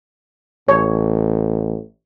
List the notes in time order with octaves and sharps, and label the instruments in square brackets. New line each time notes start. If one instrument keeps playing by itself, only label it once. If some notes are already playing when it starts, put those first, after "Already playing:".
[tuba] A1 [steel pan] C#5